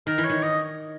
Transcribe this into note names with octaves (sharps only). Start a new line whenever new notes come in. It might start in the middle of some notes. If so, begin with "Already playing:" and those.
D#3 A#4
E3
C#5
D#3
D#5